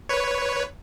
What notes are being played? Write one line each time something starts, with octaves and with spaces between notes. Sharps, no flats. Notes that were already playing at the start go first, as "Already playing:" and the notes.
B4 C#5